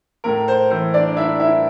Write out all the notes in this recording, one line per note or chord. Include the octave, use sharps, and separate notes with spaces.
A2 A#4
C5
E3 C5
D4 D5
D4 E4 E5
E4 E5